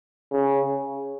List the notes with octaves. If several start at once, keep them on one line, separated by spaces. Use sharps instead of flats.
C#3